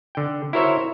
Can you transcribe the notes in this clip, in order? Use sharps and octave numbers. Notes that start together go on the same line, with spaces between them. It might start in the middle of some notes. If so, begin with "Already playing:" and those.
D3 G5
E4 F#4 A#4 C5 C#5 E5